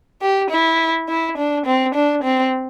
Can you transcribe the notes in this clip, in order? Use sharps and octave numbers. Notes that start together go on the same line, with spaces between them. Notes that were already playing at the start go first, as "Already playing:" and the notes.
G4
E4
E4
D4
C4
D4
C4